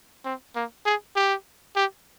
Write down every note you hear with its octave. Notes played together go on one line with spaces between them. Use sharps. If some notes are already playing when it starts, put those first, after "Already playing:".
C4
A#3
G#4
G4
G4